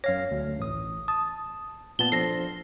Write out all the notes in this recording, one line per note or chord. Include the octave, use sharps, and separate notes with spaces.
F#2 C#5 F5 A#6
D2
A1 D#6
A5 D#6
A#2 B3 A5 G7
F3 D4 A4 A#6 C7